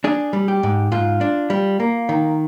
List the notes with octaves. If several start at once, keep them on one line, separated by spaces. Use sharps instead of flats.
D4 G#4
G3
G4
G#2
G#2 F4
D4
G3
A#3
D#3